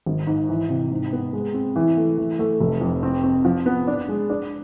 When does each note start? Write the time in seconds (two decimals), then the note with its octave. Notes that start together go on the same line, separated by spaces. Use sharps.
0.06 G#1
0.27 G#2
0.49 E3
0.70 C3
0.91 G#2
1.13 B3
1.33 G#3
1.54 C4
1.76 E3
1.97 A3
2.18 E3
2.39 A3
2.61 F1
2.81 F2
3.03 C4
3.24 C4
3.45 F3
3.66 B3
3.87 D4
4.09 G#3
4.30 D4